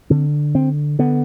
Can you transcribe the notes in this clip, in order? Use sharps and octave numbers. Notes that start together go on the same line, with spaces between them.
D3 C4
D3 C4
D3 B3